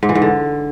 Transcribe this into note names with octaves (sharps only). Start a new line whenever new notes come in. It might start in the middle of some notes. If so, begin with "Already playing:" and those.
G#2
E3
G#2
D3